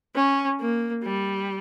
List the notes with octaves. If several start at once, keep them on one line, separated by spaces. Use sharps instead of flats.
C#4
A#3
G3